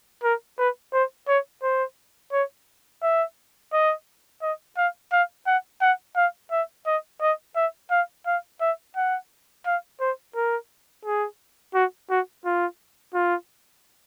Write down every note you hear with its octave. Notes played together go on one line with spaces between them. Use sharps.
A#4
B4
C5
C#5
C5
C#5
E5
D#5
D#5
F5
F5
F#5
F#5
F5
E5
D#5
D#5
E5
F5
F5
E5
F#5
F5
C5
A#4
G#4
F#4
F#4
F4
F4